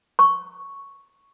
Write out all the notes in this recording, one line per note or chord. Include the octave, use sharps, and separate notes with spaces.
C#6